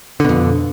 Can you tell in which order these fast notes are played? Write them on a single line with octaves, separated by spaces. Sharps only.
D3 B2 F2